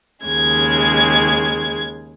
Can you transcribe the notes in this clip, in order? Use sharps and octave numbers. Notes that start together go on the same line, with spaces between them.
D#2 C#3 G#3 G#6